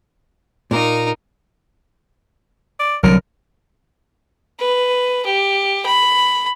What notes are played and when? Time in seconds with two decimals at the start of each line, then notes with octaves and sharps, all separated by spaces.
0.71 A#2 A#3 D#4 A#4
2.80 D5
3.03 C2 D3 F#3 A#4
4.60 B4
5.26 G4
5.86 B5